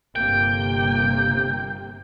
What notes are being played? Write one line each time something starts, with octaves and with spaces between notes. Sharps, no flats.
G1 C3 A#3 G5